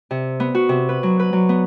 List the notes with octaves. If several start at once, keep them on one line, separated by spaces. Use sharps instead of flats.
C3
B3
F#4
C3
B4
F#3
B4
F#3
B3